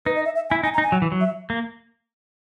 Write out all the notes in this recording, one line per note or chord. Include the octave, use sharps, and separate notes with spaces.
D#4 B4
D#5
E5
E5
E4 G#5
D#4 G#5
A#5
D#4
G#5
F#3
E3
F#3
E5
A#3